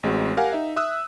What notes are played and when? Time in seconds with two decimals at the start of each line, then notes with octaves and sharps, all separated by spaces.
0.03 A1 G#3 C4 F#4
0.37 G4 A#4 F5 F#5 G#5
0.53 D#4 E5
0.76 E5 D#6 E6 F#6